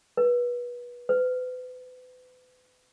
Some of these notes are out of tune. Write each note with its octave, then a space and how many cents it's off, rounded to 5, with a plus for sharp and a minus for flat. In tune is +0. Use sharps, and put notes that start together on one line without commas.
B4 -25
B4 +35